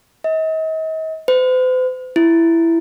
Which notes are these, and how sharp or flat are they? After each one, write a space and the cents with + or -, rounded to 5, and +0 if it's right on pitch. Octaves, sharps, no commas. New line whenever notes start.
D#5 +40
C5 -45
E4 +10